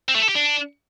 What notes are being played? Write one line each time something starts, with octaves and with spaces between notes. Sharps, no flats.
C4
A3
A4
G4
D4